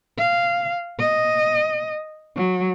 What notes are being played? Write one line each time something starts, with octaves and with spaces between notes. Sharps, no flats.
F5
D#5
F#3